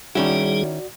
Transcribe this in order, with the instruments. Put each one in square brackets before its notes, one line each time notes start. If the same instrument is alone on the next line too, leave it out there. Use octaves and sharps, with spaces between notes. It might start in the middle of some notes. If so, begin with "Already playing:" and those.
[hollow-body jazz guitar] D#3 C#4 E4 [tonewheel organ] G3 D#4 G#4 [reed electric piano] F#4 D5